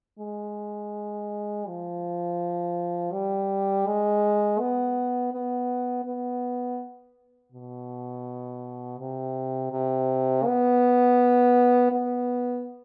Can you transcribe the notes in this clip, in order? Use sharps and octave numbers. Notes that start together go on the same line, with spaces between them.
G#3
F3
G3
G#3
B3
B3
B3
B2
C3
C3
B3
B3